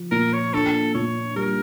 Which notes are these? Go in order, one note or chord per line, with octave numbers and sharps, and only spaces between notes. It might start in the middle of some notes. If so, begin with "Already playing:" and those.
Already playing: F3
A#2 A#4
C#5
D4 A4
A#2 C#5
G3 A#4